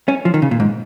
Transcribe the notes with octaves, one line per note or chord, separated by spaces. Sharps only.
C#4
F3
D#3
C#3
A#2
G#2